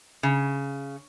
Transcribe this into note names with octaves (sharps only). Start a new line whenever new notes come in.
C#3